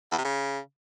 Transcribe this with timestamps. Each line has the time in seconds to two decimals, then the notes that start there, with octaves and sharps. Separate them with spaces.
0.12 E2
0.18 C3
0.24 C#3